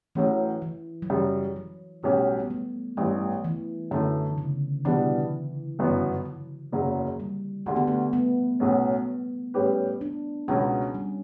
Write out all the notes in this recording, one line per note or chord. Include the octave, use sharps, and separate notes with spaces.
A1 A2 E3 F#3 C#4
E3
F#3
F#2 C#3 E3 G3
F#3
B1 A2 F#3 G3 C#4 G4
B3
A3
A1 G2 E3 A3
E3
F#2 D3 E3 A3
C#3
B2 E3 G3 B3 D4
G1 F#2 E3 B3 F#4
F#3
F#1 E2 C#3 F#3
G3
D2 D3 G3 A3
B3
A3
B3
B1 A2 F#3 C#4
A2 G3 C#4 G4 B4
D4
C#2 B2 F#3 B3 C#4
G3